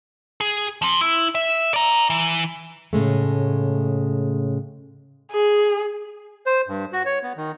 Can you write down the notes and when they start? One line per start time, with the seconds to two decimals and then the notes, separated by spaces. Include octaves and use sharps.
0.41 G#4
0.82 F3 C4
1.01 E4
1.35 E5
1.74 D5 A#5
2.10 E3
2.93 A2 C#3 G#3 A3
5.32 G#4
6.46 C5
6.68 G2
6.93 F#4
7.05 C#5
7.23 B3
7.37 D#3